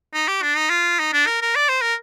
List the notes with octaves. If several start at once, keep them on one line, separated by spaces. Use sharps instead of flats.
D#4
G4
D4
D#4
F4
D#4
D4
A#4
A#4
D5
C5
A#4